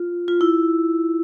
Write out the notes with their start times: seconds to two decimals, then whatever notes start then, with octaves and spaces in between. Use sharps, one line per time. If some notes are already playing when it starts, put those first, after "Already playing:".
Already playing: F4
0.28 F4
0.41 E4